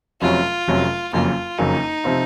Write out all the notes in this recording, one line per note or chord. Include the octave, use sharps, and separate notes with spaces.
F1 F2 C3 F#3 C#4 F4
F1 F2 C3 F#3 C#4
F#1 F2 C#3 F#3 A#3 F4
F#1 F2 C#3 F#3 A#3 D#4
C3 F3 C4 F4